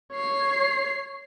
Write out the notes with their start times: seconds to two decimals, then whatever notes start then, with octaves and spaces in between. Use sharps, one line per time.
0.12 C#5 C7